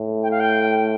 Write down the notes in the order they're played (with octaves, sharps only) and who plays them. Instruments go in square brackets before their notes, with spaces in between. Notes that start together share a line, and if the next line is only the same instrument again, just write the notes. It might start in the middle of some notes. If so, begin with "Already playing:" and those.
Already playing: [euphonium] A2
[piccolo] G5
F5
G5